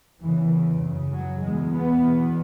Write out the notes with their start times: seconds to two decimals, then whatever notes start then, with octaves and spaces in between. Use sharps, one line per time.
0.22 E2 C#3 E3
0.52 C#3
0.82 F#2 C#3
1.12 F#3
1.42 E2 B2 G#3
1.71 B3
2.01 E2 B2